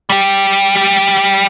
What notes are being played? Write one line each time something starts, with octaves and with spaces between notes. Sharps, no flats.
G3 G4